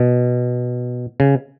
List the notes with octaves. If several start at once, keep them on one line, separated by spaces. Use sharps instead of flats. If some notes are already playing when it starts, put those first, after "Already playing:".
Already playing: B2
C#3